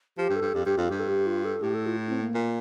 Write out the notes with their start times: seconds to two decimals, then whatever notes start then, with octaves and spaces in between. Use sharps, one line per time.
0.18 F3 G4
0.30 G2
0.36 A4
0.42 G2
0.54 F2 G4
0.66 G2 G4
0.77 F2 F4
0.90 G2 G4
1.00 A4
1.09 G4
1.26 F4
1.44 A4
1.62 A2 G4
1.74 A4
1.86 F4
1.97 E4
2.09 C4
2.21 A#3
2.34 A#2